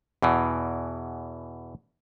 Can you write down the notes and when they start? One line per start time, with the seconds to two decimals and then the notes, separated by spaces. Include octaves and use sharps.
0.22 E2 B2 E3